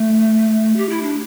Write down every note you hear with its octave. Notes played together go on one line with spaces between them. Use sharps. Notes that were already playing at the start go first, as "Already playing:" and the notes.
Already playing: A3
G4
E4
D4